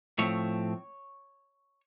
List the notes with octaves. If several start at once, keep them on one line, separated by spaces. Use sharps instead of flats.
A2 F3 A3 C4 C#5